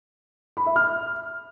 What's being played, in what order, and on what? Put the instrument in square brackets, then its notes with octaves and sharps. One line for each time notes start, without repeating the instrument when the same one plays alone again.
[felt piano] B5
E5
F6